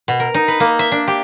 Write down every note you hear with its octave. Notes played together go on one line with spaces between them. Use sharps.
B2
A#4
D#4
B4
A#3
E5
D4
G4